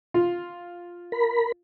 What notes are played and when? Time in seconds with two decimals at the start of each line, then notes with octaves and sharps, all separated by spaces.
0.14 F4
1.12 A#4 B5